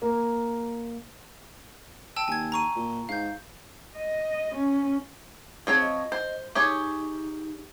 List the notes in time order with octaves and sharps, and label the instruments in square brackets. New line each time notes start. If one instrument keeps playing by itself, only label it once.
[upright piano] A#3
[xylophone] G5 A5 E6
[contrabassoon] D#2 [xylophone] G#5 G#6
[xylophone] A#5 C#6 D#7
[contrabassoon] A#2
[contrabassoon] G#2 [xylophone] F5 G6
[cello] D#5
C#4
[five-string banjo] F3 C4 C#5 [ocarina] G#4
[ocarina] D#5
[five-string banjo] C5
[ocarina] D#4 [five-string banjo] G4 G#4 C#5